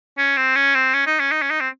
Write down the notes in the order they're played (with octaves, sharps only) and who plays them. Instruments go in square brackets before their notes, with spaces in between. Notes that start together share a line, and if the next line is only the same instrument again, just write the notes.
[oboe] C#4
C4
C#4
C4
C#4
D#4
C#4
D#4
C#4
D#4
C4